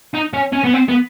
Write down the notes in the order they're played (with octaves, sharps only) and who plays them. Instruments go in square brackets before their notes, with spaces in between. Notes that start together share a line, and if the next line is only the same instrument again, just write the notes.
[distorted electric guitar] D#4
C#4
C#4
B3
C4
B3